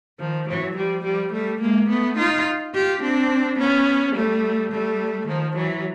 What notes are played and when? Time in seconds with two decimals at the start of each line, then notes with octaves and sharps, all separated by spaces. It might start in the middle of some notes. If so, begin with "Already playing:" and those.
0.19 D#3 F3
0.47 E3 F#3
0.76 F3 G3
1.04 F3 G3
1.32 G3 A3
1.60 G#3 A#3
1.88 A3 B3
2.17 D#4 F4
2.73 F4 G4
3.01 C4 D4
3.58 B3 C#4
4.15 G3 A3
4.71 G3 A3
5.27 D#3 F3
5.55 E3 F#3